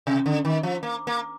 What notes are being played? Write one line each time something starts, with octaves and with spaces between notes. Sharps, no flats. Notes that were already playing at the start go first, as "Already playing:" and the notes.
C3
D3
D#3
F3
A#3
A#3